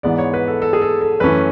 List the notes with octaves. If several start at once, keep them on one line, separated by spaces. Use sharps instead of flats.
G#2 E3 G#3 B3 D5
C#5
B4
A4
A4
G#4
A4
A4
F#2 E3 A3 C#4 B4